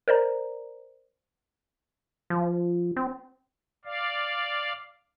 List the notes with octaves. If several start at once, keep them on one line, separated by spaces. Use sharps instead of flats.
A#4 C5 D5 A#5
F3
C4
D5 F5